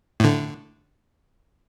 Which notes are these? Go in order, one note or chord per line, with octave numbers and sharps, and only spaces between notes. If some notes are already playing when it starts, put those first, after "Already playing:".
A2 D3